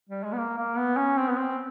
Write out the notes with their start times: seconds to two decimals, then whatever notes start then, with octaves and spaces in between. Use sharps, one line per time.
0.09 G3
0.24 G#3
0.33 B3
0.38 A#3
0.58 A#3
0.77 B3
0.97 C#4
1.18 C4
1.30 B3
1.38 C4